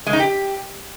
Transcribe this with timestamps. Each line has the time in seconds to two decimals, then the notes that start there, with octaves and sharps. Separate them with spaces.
0.07 G#3
0.13 D#4
0.20 G4